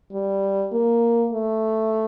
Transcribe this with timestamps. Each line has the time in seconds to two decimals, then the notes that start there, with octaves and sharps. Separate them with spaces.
0.12 G3
0.72 A#3
1.33 A3